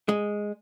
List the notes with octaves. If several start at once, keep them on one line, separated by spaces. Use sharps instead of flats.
G#3